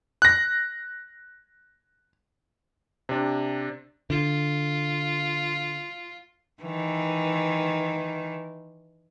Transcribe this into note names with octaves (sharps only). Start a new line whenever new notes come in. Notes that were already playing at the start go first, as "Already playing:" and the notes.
F#6 A#6
C3 D4
D3 F4
D#3 E3